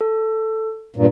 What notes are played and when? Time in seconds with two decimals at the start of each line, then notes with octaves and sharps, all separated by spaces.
0.01 A4
0.96 G2 A#2